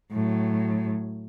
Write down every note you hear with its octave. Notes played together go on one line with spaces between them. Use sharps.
A2 F#3